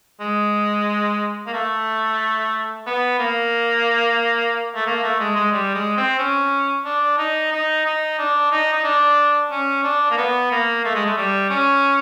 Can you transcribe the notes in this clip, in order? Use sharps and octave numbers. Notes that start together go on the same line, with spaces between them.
G#3
A#3
A3
B3
A#3
A3
A#3
A3
G#3
G#3
G3
G#3
C4
C#4
D4
D#4
D#4
D#4
D4
D#4
D#4
D4
C#4
D4
A#3
B3
A#3
A3
G#3
A3
G3
C#4